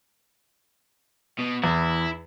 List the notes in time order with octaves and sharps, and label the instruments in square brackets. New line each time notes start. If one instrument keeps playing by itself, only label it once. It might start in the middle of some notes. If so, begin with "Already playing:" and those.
[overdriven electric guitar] B2
[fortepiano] E2 [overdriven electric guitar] E4